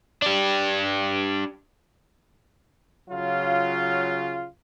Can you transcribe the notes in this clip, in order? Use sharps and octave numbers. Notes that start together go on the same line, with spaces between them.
D4 G4
C#3 F#3 F4